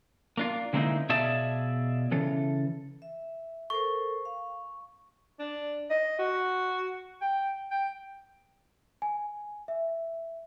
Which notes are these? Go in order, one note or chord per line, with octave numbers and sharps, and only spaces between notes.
A#3 D4 F4
D3 G#3 A#3 C4 D#4 E4
B2 F4 G#4 D5 E5 A5
C#3 E3 A4
E5
A4 A#4 C5 C#6
F5
D4
D#5
F#4
G5
G5
G#5
E5